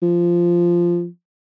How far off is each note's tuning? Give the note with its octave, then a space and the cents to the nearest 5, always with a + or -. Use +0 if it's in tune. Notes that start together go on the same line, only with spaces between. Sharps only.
F3 -10